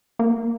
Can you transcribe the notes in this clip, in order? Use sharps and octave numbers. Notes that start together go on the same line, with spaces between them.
A#3